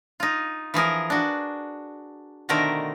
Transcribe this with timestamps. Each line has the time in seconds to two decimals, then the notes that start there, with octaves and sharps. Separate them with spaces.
0.20 D#4 F4
0.74 E3 F3 G#4 A#4
1.10 D4 F#4
2.49 B2 D3 D#3 A3 A#4 C5